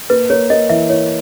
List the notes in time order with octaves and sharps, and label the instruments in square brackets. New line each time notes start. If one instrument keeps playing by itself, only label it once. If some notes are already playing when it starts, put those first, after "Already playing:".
[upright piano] A#3 [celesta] B4
[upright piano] A#3 [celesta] C#5
[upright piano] A#3 [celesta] D#5
[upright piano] E3 [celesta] E5
[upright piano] E4 [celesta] C#5